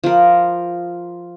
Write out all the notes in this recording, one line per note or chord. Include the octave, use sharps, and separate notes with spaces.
F3 A#4